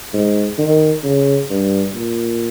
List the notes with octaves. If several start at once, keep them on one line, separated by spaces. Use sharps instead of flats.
G#2
D#3
C#3
G2
A#2